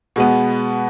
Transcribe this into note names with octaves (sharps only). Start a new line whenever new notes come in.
B2 G#3 B3